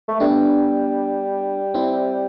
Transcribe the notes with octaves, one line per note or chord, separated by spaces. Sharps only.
A3
G3 B3 D4
C4 E4